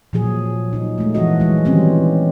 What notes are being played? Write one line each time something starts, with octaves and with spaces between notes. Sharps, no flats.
A#2 F3 F#3 G#4
F#3 D#4
G#3 A3
E3 F3 B3 F#4 D#5
F#3 G#3
D#3 E3 F#3 G3 C4 C#4